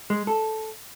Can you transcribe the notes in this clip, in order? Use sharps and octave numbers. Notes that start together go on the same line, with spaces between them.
G#3
A4